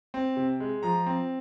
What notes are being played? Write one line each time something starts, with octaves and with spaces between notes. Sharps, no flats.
C4
C3
G#3
F3 A#5
C4